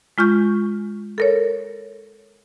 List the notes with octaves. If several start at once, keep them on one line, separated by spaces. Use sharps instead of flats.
G#3 F4 C#6 G6
A4 A#4 C#5